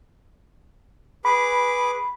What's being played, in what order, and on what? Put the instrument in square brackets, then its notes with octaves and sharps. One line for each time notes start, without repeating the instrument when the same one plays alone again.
[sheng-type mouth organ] G#4 B4 D6 [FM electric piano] B5